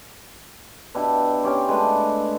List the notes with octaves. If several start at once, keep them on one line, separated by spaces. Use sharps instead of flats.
B2 D4 E4 G4
C#4 G4 D5 C6
G#3 A3 D4 B4